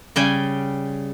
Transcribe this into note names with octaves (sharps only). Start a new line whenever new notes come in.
C#3 G3 G5 G#5